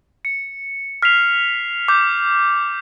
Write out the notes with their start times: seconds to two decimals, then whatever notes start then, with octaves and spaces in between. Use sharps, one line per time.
0.25 C#7
1.02 F6 B6 C7 F7
1.88 D6 G6